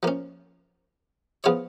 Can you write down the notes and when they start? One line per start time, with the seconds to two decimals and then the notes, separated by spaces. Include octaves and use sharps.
0.03 F3 A#3 C#4
1.44 F3 B3 F4 G#4 C#5